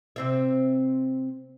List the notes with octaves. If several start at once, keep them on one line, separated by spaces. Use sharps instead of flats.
C3 C4 E5